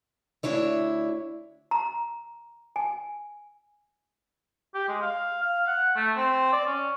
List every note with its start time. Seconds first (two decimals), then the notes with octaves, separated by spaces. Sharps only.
0.43 D2 A#2 D4 E4 C#5 E5
1.71 A#5
2.76 G#5
4.74 G4
4.88 G#3
5.02 F5
5.42 F5
5.67 F#5
5.96 A3
6.17 C4
6.53 D5
6.67 C#4